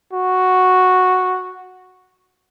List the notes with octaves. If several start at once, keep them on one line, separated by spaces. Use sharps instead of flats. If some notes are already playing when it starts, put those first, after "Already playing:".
F#4